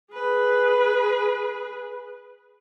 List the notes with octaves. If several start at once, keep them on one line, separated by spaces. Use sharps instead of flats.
G#4 B4